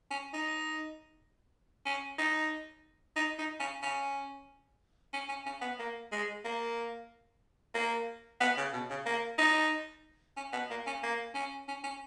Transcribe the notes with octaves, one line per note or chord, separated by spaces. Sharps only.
C#4
D#4
C#4
D#4
D#4
D#4
C#4
C#4
C#4
C#4
C#4
B3
A#3
G#3
A#3
A#3
B3
C#3
B2
C#3
A#3
D#4
C#4
B3
A#3
C#4
A#3
C#4
C#4
C#4